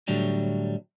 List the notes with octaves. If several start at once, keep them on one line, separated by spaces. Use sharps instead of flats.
A2 D3 F#3 G3